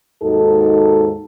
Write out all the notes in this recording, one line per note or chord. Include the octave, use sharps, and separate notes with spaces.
D#2 G#2 D#4 F#4 A4